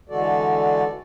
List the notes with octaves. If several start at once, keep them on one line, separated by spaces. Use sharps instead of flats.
D3 E3 G#3 F#4 A4 D5